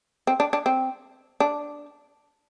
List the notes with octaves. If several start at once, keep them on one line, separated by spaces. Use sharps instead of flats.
C4
D4
D4
C4
D4